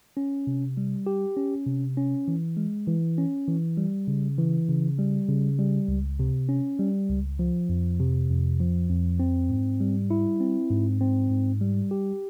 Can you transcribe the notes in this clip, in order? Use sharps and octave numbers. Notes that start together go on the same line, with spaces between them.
C#4
C3
G3
G4
C#4
C3
C#4
E3
G#3
E3
C#4
E3
G3
C#3
E3
C#3
G3
C#3
G3
C#2
C3
C#4
G3
C#2
F3
F2
C3
F2
F3
F2
C4
G#2
G3
E4
C4
G#2
C4
G#2
G3
G4